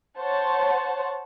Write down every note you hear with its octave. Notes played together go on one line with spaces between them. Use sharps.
C5 C#5 F#5 A5